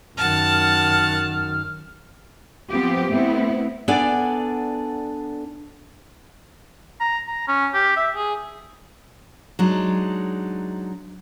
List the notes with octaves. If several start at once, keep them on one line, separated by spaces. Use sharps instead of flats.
F#2 D#3 F#5 A5 F6
F3 B3 C4 F4 G4
A3 B3 C4 E4
B3 D4 A4 D5 G#5
A#5
A#5
C#4
G4
E5
G#4
F#3 G#3 D4 D#4